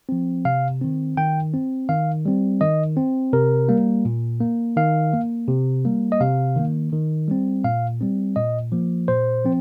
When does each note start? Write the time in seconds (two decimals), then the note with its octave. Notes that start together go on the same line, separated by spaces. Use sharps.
0.09 F3 C4
0.45 C3 F5
0.81 D#3 C4
1.17 D#3 G5
1.54 C4
1.89 D#3 F5
2.25 G3 C4
2.61 D#3 D#5
2.97 C4
3.33 C3 A#4
3.68 G3 A#3
4.05 A#2
4.40 A#3
4.76 D#3 F5
5.13 A#3
5.48 C3
5.85 G3 A#3
6.12 D#5
6.21 C3 F5
6.56 D#3 A#3
6.92 D#3
7.28 G3 C4
7.64 A#2 F5
8.01 G3 C4
8.36 A#2 D#5
8.72 F3 A#3
9.08 A#2 C5
9.45 F3 C4